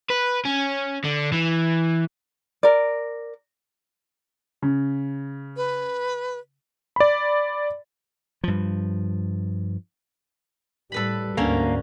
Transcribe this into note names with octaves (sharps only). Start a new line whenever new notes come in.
B4
C#4
D3
E3
A#4 D5
C#3
B4
D5 B5
G2 F3
A2 G3 A4 B4 B5
D2 G#2 D3 A#3 C#4 A#4